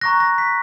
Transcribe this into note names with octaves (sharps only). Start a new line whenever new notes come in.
A#5 C#6 F#6 A#6
A#6
B6